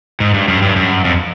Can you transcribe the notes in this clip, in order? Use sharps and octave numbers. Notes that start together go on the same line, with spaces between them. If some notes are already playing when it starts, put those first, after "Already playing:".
G#2
G2
F#2
G2
F#2
F2